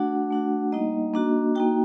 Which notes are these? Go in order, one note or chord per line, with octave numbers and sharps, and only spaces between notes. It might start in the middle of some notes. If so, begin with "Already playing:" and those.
Already playing: A3 D4 F#4 F#5
A3 D4 F#4
G3 A#3 D#4 D#5
A#3 D4 F#4
A#3 D#4 F#4 G5